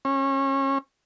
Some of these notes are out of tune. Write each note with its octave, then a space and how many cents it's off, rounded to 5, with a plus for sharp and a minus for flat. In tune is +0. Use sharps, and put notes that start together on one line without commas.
C#4 -30